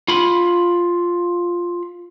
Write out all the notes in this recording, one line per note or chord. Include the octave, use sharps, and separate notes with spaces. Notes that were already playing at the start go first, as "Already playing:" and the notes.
F4 B5